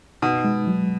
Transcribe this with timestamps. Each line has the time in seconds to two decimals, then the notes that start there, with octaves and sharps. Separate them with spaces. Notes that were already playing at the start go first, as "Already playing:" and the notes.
0.22 B2 D#4
0.44 G#3
0.67 F#3